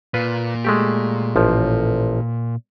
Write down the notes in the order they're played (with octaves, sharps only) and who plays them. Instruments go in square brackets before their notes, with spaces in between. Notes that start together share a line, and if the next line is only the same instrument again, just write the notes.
[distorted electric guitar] A#2 [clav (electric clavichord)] F4 B4
[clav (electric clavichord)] G#3 A3 G4
A1 F3